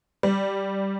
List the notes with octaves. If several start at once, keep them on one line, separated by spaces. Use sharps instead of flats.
G3